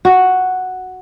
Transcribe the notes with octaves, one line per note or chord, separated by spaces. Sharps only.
F#4